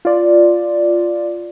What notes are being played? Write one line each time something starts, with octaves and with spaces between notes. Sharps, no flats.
F4 D5